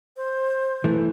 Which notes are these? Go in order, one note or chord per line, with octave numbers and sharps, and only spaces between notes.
C5
E3 A3